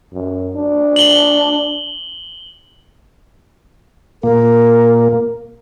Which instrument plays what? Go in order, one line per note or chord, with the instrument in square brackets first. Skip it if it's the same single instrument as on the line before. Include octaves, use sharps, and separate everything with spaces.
[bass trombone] F#2
D4
[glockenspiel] F#7 G7
[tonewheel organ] A#2 A#3 [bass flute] A#4